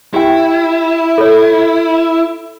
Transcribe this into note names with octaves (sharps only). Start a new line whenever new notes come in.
E4 G4 G5
A4 C#5